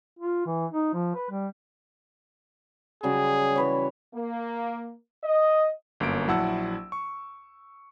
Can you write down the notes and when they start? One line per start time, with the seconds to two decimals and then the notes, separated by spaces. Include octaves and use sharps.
0.19 F4
0.46 E3
0.71 D#4
0.94 F3
1.15 B4
1.30 G3
3.03 C#3 F#3 G3 G#4
3.56 E3 B4 C#5
4.14 A#3
5.24 D#5
6.00 G1 F#2 A#3 D7
6.28 A#1 F#3 E4 F#5 A5 E6
6.92 C#6